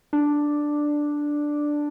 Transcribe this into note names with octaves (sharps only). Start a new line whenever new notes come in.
D4